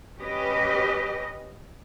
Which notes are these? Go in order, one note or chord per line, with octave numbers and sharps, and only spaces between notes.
C#4 G4 B4 D#5